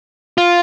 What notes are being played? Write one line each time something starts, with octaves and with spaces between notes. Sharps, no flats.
F4